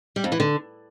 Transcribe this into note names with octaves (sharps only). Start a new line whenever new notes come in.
G3
F2
E3
D3